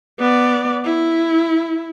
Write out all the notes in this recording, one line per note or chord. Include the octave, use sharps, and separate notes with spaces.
B3 D5
E4